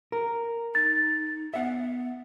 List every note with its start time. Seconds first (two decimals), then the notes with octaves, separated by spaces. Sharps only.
0.12 A#4
0.75 D#4 A6
1.54 B3 E5 F#5